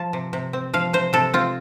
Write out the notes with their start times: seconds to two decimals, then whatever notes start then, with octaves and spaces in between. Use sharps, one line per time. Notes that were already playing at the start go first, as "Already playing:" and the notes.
Already playing: F3 A5
0.13 C3
0.33 C3
0.53 C4
0.73 F3 F5
0.93 C3 C5
1.13 C3 A4
1.34 C4 F4